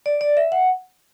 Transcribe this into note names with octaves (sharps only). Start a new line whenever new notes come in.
D5
D5
E5
F#5